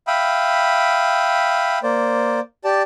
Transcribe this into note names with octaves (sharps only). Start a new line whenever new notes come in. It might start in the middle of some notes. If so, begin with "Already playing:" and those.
E5 F5 G5 B5 D#6
A#3 C5 D5
G4 D5 A5